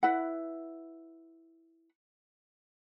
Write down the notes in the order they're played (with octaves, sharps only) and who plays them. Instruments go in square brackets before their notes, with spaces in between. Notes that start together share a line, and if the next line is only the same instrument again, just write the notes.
[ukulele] E4 B4 F#5